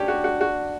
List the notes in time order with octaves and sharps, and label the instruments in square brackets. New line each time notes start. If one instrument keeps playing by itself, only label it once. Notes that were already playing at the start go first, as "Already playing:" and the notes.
Already playing: [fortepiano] C#4 G4 [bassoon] D4
[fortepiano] F#4
F#4
F#4